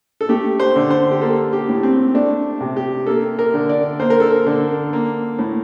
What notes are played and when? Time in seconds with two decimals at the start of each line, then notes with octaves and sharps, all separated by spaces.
0.21 A4
0.29 A3 G4
0.60 C5
0.76 D3
0.90 C5
1.11 G4
1.22 A#3 A4
1.53 G4
1.69 A2
1.83 C4
2.14 A3 D4
2.60 C3
2.77 G4
3.06 A#3 A4
3.39 A#4
3.54 D3
3.69 D5
4.00 A#3 C5
4.10 A#4
4.20 A4
4.30 A#4
4.46 D3
4.93 A#3
5.38 A2